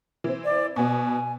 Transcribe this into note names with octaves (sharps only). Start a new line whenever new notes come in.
E3 C4
D5
B2 B3 G#5